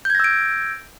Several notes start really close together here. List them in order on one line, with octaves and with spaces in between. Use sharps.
G6 G#6 A#6 E6 D7